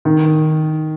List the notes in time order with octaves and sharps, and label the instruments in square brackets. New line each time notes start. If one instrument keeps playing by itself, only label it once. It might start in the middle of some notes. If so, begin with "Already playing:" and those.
[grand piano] D#3